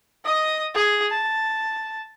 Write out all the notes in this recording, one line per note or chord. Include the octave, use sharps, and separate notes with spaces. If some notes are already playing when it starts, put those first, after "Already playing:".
D#5 D#6
G#4
A5